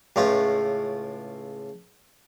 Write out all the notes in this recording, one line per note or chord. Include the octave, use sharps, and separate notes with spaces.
C#2 A2 F4